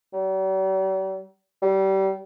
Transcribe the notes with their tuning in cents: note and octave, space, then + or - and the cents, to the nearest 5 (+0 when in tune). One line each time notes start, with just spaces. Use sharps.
G3 -45
G3 -25